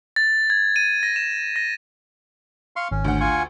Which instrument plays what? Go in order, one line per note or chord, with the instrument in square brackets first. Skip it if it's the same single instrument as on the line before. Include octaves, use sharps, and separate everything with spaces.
[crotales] A6
G#6
D#7
A#6
E7
A#6
[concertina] F5 C6 C#6
[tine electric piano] G#1 [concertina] C#4
[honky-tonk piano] D2 F#5
[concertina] F4 G#5 C#6